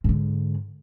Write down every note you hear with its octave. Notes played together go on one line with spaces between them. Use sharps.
G#2 D3